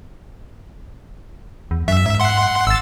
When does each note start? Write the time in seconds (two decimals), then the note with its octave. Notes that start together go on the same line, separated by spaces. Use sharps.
1.71 E2
1.88 F#2 E5
2.06 G#2
2.20 F#5 C6
2.67 G#1 E6 A6